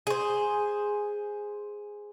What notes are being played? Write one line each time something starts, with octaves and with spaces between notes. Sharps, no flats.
G#4 C5